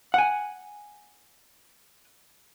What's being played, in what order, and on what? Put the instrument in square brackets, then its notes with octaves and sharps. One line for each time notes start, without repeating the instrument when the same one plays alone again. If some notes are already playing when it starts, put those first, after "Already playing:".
[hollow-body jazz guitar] F#5 G#5